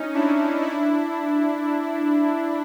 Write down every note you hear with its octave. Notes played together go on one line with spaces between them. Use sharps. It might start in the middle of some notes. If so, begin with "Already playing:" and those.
Already playing: C#4 D#4
D4 E4
D4 E4